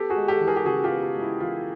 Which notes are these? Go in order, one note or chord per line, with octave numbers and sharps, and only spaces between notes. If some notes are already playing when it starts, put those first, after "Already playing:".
Already playing: B3 G4 A4
F#4 G#4
G#3
G4 A4
E3
G#4 A#4
G4
C#3 F#4 G#4
F4 G4
B3
F4
G#3
E4
E3 F4